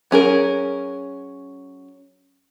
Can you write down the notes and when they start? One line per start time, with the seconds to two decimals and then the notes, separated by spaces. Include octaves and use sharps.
0.11 F#3 C#4 G#4 A#4